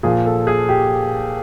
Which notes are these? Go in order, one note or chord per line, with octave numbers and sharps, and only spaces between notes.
A#2 F3 G#4
A4
G#4
G4